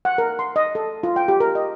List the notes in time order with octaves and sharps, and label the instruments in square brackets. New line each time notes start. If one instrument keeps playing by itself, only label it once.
[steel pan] F#5
A#4
C6
D#5
A4
F4
G5
G4
A#4
D#5